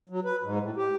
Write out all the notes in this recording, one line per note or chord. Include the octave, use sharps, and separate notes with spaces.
F#3
B4
G#2
A2
G4